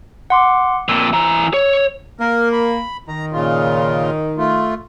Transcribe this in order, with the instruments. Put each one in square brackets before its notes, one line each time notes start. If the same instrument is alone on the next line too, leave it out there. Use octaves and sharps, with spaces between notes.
[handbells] F#5 C6 D6
[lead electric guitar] F2 A#2 [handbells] E6
[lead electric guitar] E3 A#5
C#5
[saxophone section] A#3 [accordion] A#4
[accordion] B5
[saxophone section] D#3 [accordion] A#5
[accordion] A#2 C#3 F4
A3 F4